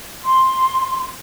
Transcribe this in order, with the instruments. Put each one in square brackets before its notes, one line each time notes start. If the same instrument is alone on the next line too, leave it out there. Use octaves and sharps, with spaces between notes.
[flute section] C6